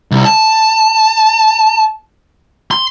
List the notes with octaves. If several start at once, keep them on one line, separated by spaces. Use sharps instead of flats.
C2
A5
C6